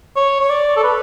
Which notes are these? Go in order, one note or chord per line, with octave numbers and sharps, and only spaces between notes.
C#5
C#5
D5
A4
B4